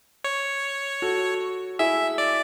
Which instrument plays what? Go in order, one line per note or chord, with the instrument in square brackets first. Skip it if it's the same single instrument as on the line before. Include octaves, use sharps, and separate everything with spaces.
[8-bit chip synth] C#5
[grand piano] F#4 A4
[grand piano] E4 G#4 [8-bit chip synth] E5
[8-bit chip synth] D5